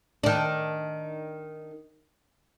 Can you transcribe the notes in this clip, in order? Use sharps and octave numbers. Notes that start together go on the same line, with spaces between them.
D#3 D4